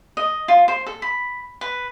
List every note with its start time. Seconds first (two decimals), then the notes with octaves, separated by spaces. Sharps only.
0.17 D#5
0.48 F4
0.68 C5
0.86 A4
1.02 B5
1.61 B4